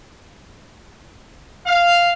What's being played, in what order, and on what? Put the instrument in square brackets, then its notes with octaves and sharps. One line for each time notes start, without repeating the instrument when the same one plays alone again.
[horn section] F5